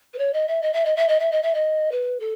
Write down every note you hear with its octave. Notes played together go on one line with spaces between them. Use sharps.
B4
C#5
D#5
E5
D#5
E5
D#5
E5
D#5
E5
D#5
E5
D#5
B4
A4